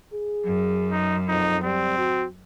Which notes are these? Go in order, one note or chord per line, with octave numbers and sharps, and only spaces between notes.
G#4
F#2
D#4
F2 D#4
G3 C4
F#4